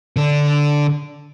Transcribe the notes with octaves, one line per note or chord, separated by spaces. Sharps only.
D3 D4